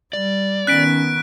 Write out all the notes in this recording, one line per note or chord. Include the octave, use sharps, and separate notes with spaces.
G3 D5
D#3 B3 C#4 F#6 B6 D7